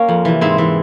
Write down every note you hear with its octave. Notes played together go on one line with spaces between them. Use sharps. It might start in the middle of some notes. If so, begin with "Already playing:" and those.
Already playing: A#3 C#4
F2
C3 E3
G#2 C4 E4
E3